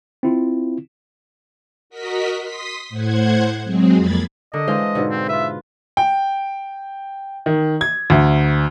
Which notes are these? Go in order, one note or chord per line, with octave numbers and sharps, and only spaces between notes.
C4 E4 F4
F#4 A#4 D#5 B6
C6 D#6 B6
A2 C5 F#5 G#6
F#3 G#3 C4 G#4
F2 A#3 B5 G#6 A6
D3 A#4 D#5
E3 G#3 D4 C5 F5
G#2 B2 D3
C4
F4 B4 E5
G5
D#3
G#6
D2